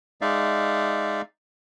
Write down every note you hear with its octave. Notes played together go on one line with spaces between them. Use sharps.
G#3 D#4 D5 E5 F5